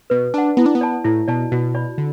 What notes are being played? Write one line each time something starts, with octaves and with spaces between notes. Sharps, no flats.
B2 B4
D4 F#5 A5
B3 E4
D4
B3
D5 A5
A2 E4
B2 D5 A5
B2 F#4
D5 B5
D3